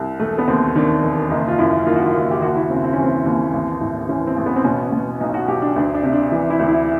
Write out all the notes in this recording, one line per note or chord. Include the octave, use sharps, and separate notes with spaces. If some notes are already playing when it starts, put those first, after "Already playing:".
Already playing: C2
E1 A3
B3
D#2 C4
D#3 D4
E1
F#1 D#4
F4
F#2 E4
D#3 F4
F#4
F4
F#1
G4
D#2 F#4
E4
C#3 C4
C4
E3 C#4
C4
D#2
A1
A2
E3 C#4
C4
A1
B3
C4
B2 C#4
B2
B1 D#4
F#4
B1 G4
D4
D2 D4
D4
C3
D4
E3
E4
D2
E4